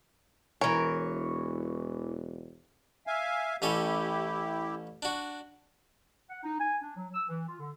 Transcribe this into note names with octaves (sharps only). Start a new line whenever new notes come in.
E1 E3 A#4 C#5
E5 F5 G#5
A1 C#4 E4 G4 A4
D4 F#4
F#5
D#4
G#5
D4
F#3
E6
E3
F4
D3